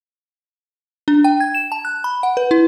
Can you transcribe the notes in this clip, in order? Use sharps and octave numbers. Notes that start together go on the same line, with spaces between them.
D4
G5
G#6
E7
A5
F#6
B5
F#5
B4
E4